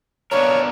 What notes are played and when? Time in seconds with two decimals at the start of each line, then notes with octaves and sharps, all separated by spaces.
0.31 B3 D4 F4 A#4 C#5